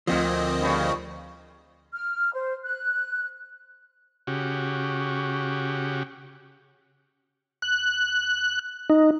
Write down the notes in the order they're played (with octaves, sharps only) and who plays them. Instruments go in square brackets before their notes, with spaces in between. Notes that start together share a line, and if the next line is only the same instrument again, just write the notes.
[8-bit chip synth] D2 C4 D#5 [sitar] A#2 [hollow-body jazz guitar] F3
[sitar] G2 C#3
[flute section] F6
C5
F#6
[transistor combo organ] C#3 F#4 G4
[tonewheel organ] F#6
D#4